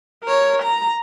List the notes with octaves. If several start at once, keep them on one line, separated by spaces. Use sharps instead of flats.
A#4 C#5
A#5